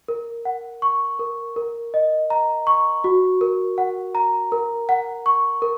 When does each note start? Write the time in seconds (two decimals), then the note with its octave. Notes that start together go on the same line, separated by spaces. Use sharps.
0.08 A#4
0.45 F#5
0.82 C#6
1.19 A#4
1.56 A#4
1.94 D#5
2.30 A#5
2.67 C#6
3.04 F#4
3.41 A#4
3.78 F#5
4.15 A#5
4.52 A#4
4.89 F#5
5.26 C#6
5.62 A#4